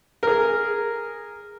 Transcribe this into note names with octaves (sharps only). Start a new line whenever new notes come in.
G#4 A#4